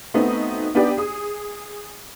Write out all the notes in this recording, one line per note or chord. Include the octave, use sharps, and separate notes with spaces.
A3 B3 C4 D#4 F#4
B3 D4 D#4 G4 B4 D5
G#4 D#6